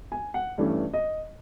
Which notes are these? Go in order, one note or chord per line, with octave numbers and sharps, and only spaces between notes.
G#5
F#5
G2 E3 A3 C#4 D5
D#5